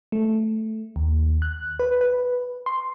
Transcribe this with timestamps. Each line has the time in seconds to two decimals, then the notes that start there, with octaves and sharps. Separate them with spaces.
0.12 A3
0.96 D#2
1.42 F#6
1.79 B4
2.01 B4
2.66 C6